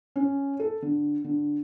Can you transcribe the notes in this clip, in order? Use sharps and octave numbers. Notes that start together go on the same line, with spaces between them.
C#4
A4
D3
D3